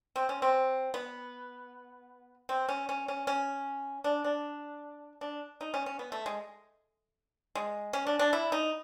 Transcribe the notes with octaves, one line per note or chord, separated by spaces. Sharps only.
C4
C#4
C4
B3
C4
C#4
C#4
C#4
C#4
D4
D4
D4
D#4
C#4
C#4
B3
A3
G#3
G#3
C#4
D4
D4
E4
D#4